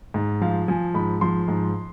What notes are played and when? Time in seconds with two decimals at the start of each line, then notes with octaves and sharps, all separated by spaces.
0.14 G#2
0.41 F3 F5
0.68 F3 G#5
0.94 G#2 B5
1.21 F3 C6
1.48 G#2